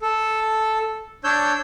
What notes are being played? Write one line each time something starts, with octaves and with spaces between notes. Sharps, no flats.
A4
D4 C#5 E6 G6